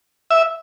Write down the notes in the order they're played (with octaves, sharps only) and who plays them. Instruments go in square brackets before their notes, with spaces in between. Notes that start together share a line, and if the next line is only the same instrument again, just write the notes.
[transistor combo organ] E5